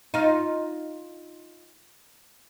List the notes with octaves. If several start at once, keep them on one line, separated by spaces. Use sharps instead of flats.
D#4 F4